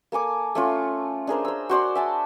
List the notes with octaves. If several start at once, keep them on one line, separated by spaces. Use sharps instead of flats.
A#3 A4 G#5 D6
A3 C#4 F4
D4 G#4 A#4 C5
C5 E6
F#4 C5 D5 C6
E5 G#5 A5